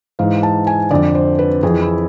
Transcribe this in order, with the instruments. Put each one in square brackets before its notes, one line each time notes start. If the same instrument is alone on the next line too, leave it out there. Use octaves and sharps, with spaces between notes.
[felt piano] G#2 E3 F5
A5
G#5
F2 D3 D5
C5
B4
F2 E3 G#4
E4